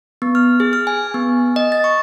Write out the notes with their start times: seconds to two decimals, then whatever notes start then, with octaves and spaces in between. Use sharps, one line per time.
0.22 B3
0.35 F6
0.60 G#4
0.73 F6
0.87 G#5
1.14 B3
1.56 D#5
1.72 A6
1.84 C#6